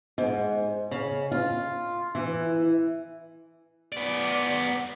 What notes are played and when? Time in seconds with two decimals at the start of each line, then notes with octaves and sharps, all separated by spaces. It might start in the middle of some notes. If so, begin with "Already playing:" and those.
0.18 G#2
0.91 C#3
1.31 F4
2.15 E3
3.92 B3 D5